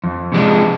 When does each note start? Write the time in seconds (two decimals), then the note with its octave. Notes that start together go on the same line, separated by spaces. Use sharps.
0.04 F2
0.32 C3 F3 G#3 D4